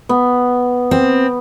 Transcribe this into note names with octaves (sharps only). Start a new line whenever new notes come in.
B3
C4